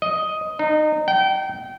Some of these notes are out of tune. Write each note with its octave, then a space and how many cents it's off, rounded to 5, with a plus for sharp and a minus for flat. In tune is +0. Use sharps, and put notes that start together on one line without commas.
D#5 +5
D#4 -25
G5 -30